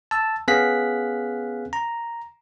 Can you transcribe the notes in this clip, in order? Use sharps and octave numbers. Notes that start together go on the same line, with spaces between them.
A5 E6
B3 C#4 G#4 F5 F#6 B6
A#5